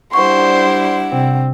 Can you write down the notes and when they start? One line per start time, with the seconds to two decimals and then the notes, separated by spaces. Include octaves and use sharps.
0.13 G3 D4 E4 C5 F#5 C6 C#6
1.12 C3 C4